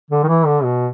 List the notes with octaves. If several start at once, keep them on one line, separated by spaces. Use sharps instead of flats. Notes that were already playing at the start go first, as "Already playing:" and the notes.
D3
D#3
E3
D3
B2